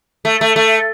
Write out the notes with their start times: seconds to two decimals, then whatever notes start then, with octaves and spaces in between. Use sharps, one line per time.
0.25 A3
0.41 A3
0.56 A3